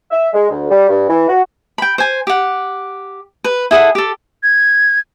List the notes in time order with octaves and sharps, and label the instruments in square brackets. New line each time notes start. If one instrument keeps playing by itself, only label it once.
[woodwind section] E5
G#3
D2
G3
G2
E3
F#4
[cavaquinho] G5 B5
C5 G#5
G4 F#5
B4
E4 G#4 A4 F#5
G4 A4
[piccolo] G#6